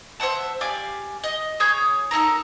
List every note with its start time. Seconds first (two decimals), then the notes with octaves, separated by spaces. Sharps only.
0.20 C5 E5 F#5 A5
0.61 G4 D5 F5 G#5
1.24 D#5
1.60 G#4 C#5 G6
2.11 D#4 E4 A4 A#4